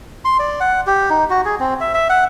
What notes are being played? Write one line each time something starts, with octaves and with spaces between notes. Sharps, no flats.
C6
D5
F#5
G4
D#4
F#4
G#4
C4
E5
E5
F#5